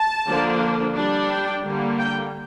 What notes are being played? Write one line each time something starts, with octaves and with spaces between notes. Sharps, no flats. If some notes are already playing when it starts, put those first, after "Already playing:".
Already playing: A5
D3 F3 A#3 D4
G3 D4
G5
D3 G3 A#3
G5